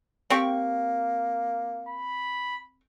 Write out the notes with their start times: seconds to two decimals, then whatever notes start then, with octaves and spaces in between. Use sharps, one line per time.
0.30 A#3 C4 G4 C#6
1.88 B5